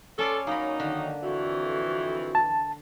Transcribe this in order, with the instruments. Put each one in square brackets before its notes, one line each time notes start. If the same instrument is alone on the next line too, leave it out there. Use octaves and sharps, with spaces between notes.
[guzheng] C#4 D5 C6 [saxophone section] A4
[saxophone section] F#3 C#4 D#4 [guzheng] A#3 B5
[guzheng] D3 [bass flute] D#3
[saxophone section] F2 E3 [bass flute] F#4
[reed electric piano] A5